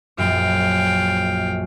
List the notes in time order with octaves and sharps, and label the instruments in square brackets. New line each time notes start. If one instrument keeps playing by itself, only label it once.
[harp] A#1 F#2 [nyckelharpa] F5 G5